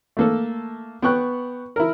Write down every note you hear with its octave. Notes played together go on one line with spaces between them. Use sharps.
A3 A#3 A4
B3 G5 C#6 F#6
E4 A#4